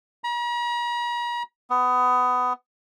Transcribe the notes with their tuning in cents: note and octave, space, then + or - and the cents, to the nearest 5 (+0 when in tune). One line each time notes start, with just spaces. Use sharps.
A#5 +45
B3 +20